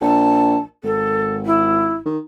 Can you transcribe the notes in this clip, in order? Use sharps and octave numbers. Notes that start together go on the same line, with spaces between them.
A#1 A5
G#1 A4
E4
D#3